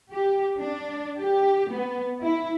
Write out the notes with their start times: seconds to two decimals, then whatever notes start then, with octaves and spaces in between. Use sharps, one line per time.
0.12 G4
0.59 D4
1.19 G4
1.71 B3
2.22 E4